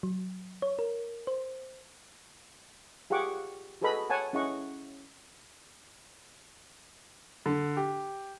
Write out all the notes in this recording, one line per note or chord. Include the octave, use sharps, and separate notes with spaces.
F#3
C#5
A#4
C5
F4 G4 G#4 F#5 C#6 D6
F#4 G#4 A4 B4 D#5 B5
C#5 F#5 G#5 A5
C#4 E4 G#4 D#5 F#5 C#6
D3
G4